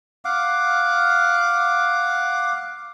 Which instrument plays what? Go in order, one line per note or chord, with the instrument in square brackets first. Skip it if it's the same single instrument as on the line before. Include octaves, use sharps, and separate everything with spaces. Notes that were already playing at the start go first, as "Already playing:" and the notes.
[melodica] F5 F#5 D6